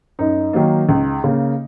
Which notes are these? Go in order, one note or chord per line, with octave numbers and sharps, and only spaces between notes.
F#2 D#4
D#3 F#3 A#3
C#2
C#3 A#3